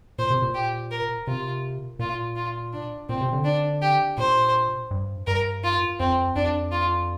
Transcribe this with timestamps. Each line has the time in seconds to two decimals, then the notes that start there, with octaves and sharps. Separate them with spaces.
0.19 A#2 C5
0.30 C3
0.42 A#2
0.54 G4
0.91 A#4
1.27 C3 F4
1.99 A#2 F4
2.36 F4
2.73 D4
3.09 A#2 C4
3.21 C3
3.33 D3
3.45 D4
3.82 G4
4.18 A#2 C5
4.91 G2
5.27 G2 A#4
5.63 F4
5.99 F2 C4
6.36 F2 D4
6.72 F4